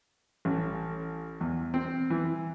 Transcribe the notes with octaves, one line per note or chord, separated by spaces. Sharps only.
A1
E2
C4
E3